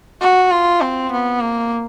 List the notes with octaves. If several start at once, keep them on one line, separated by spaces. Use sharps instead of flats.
F#4
F4
C4
B3
A#3